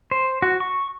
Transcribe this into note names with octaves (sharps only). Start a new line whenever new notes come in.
C5
F#4
C#6